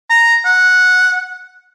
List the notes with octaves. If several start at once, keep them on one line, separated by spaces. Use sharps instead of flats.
A#5
F#5